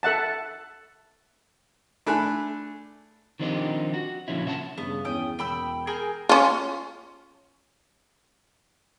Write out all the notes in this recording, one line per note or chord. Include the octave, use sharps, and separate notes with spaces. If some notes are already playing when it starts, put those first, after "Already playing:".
A4 E5 F#5 A5
A3 D4 G#5 B5 F#6
D#3 F3 C4 D4 D#4 G4
F#4
A#2 D3 F3 C#4 E4
C#3 C#4 E5 F#5 A5
G2 C#3 B3
E2 G#3 C#4 G5 D#6
E1 G5 B5 E6
G#4 A#4 G5
C#4 F4